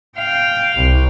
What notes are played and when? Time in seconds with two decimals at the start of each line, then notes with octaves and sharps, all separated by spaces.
0.18 F5 G5
0.76 C2